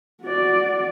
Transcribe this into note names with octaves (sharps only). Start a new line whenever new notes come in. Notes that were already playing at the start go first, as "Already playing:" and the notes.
F#4 D5